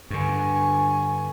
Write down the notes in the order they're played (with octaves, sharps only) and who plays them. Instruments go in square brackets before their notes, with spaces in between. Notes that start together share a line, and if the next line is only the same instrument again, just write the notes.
[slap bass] G2 D3 [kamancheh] G#5 C#6